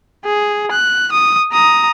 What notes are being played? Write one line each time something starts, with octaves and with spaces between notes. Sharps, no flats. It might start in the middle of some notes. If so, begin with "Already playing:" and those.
G#4
F#6
D#6
A#5 D#6